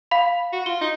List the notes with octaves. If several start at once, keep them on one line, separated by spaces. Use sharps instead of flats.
F5 B5
F#4
F4 G7
D#4